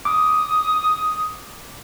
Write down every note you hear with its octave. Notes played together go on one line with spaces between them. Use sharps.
D6 D#6